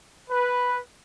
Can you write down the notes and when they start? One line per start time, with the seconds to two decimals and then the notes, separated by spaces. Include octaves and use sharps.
0.29 B4